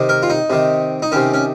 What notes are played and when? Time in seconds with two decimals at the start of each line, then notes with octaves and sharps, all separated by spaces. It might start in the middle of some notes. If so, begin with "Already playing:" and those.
Already playing: C3 D#3
0.09 A#4
0.23 F4
0.30 D#4
0.50 C3 D#3
1.02 D#4
1.12 C3 D#3 C#4
1.34 C#4